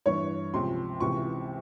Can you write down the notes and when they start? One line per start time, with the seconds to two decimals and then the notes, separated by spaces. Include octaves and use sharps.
0.06 G2 E3 C#5
0.53 C#2 C3 F3 C6
1.00 C#2 C3 E3 C#6